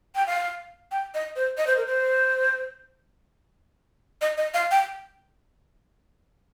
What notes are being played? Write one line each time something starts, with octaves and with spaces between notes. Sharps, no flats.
G5
F5
G5
D#5
C5
D#5
C5
A#4
C5
D#5
D#5
F5
G5